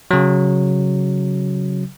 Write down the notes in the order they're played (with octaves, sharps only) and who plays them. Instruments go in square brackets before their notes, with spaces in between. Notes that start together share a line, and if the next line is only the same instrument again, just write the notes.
[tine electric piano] C#3 F#3